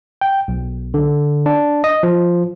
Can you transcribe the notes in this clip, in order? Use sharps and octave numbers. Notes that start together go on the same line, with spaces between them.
G5
B1
D3
D4
D#5
F3